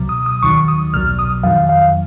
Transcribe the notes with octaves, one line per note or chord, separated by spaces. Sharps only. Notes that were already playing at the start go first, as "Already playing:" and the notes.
Already playing: C#2 B2 F#3
D#6
D#6
D#2 D#3 F#3 C#6
D#6
B1 B2 F#3 F6
D#6
F2 D#3 F#3 F5
F5